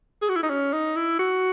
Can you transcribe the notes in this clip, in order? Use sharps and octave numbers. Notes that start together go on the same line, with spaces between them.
G#4
F#4
E4
D#4
C#4
D#4
E4
F#4